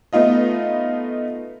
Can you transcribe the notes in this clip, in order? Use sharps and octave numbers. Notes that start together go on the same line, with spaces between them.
A3 B3 D#4 F4 D#5